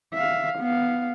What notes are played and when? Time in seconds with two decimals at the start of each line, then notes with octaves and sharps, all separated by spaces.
0.14 E5 F5
0.59 B3 F5